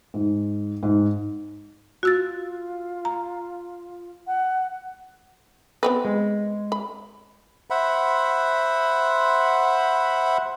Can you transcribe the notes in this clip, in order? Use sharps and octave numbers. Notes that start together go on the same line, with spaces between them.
G#2
G#2
F4 F#4 E6 A6
A#5
F#5
B3 C4 B4
G#3
B5
C5 E5 F#5 B5